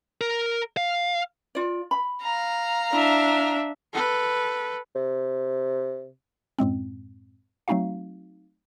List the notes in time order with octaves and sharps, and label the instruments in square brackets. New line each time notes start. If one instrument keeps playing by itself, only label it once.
[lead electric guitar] A#4
F5
[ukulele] F4 D5
B5
[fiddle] F5 A#5
[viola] D4 E5 [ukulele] E4
[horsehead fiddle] A4 B4
[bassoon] C3
[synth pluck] F#2 A2 G#3 C4
F#3 A3 C4 D#4 F#4 F5